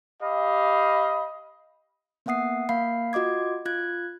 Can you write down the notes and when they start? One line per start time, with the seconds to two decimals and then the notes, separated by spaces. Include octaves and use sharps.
0.22 G4 D#5 F5 B5
2.26 A#3 B3 E5 F#5 D#6 C7
2.69 A#3 F5 B5 C7
3.13 F4 F#4 D#5 D6 G#6
3.65 F4 F#6 G#6